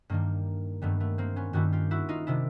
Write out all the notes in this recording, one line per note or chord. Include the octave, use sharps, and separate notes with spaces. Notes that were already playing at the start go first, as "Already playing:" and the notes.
G2 D#3 G3 A#3
G2 D#3 G3 A3 B3
A3 B3
A#3 C4
B3 C#4
G2 D#3 G3 E4 F#4
F4 G4
E4 F#4
D#4 F4
C3 D#3 D4 E4